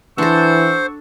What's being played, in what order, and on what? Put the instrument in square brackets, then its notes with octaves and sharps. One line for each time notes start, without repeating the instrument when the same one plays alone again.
[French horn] E3 [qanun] D4 A4 [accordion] C5 [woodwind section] F#5 C#6 E6